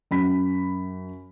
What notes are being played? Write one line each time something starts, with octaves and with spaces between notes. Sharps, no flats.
F#2 B5 B6